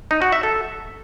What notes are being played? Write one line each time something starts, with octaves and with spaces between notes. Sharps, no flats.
D#4
F#4
E5
A4